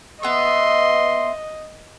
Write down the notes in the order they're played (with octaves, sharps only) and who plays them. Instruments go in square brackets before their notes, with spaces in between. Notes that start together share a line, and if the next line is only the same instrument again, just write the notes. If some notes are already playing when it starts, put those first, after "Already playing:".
[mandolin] B3 E5 [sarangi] D#5 [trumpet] C6